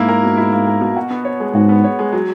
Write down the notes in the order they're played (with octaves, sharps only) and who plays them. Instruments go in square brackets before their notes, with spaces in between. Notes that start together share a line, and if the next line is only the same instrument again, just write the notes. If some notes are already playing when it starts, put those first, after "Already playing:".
Already playing: [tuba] G#2 [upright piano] A#3 E4
[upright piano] A#4
B2
E4
A#3
A#4
B2
F#4
B3
C#5
G#3
[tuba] G#2 [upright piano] F#4
[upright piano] B3
C#5
G#3
F#3